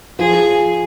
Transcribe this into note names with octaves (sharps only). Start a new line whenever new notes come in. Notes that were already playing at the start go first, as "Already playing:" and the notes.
F3 G#4